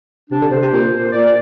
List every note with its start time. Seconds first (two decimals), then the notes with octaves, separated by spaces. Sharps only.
0.30 C3 D4
0.41 D3
0.51 C3 C5
0.62 C3
0.72 A#2
1.12 A#2 D5